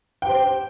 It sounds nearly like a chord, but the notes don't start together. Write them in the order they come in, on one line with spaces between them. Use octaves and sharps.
G5 G4 C5